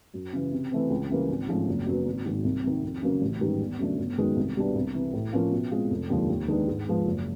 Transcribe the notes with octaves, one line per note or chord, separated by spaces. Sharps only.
F#2
C#3 E3
C3
E3 A3 C4
C#2
C#3 E3 G3 A#3
G#1
G#2 F3 A3 C#4
F#1
F#2 C#3 F#3 B3
G#1
G#2 D#3
C2
C3 D#3
F2
C#3 F#3 A#3 C#4
A1
G#2 D#3 G3 B3
E2
C#3 F#3 A3 D4
G1
F#2 D#3 G#3 B3
C2
B2 G3 B3 D4
C2
C3 E3
A2
F3 A#3 C#4 F4
B2
G#3 C4 F4
F1
D#2 D3 F3 G#3
D#2
D#3 G#3 B3 D4
G#2
F3 G#3 B3
F#1